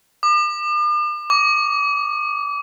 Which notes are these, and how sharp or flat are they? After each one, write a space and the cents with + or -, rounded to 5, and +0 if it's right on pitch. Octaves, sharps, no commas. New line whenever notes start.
D6 +45
D6 -30